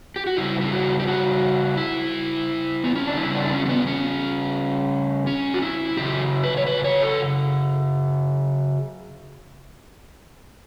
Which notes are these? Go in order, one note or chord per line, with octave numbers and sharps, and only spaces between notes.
G4
F#4
C#3 G3 E4
E4
F#4
G4
F#4
E4
B3
C#4
D4
C#3 G3 E4
D4
C#4
C#4
B3
C#4
C#4
F#4
E4
C#3 F#3 G4
B4
C#5
B4
C#5
A4